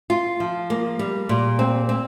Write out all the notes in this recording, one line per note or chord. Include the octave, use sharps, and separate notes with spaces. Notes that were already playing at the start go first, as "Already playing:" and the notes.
F4
F3
A#3
G3
A#2
C4
C4